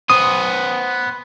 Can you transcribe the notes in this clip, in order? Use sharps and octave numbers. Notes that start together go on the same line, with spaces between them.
B3 C5 D#6